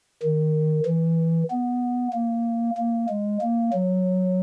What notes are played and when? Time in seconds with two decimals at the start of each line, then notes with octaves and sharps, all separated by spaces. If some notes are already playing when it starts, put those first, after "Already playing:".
0.23 D#3
0.86 E3
1.50 B3
2.13 A#3
2.78 A#3
3.09 G#3
3.42 A#3
3.73 F#3